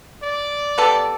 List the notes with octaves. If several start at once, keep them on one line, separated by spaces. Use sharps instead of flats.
D5
G3 B3 A4